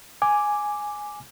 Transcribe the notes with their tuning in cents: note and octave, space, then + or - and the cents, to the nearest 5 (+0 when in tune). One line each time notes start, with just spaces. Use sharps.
G#5 +0 D6 +0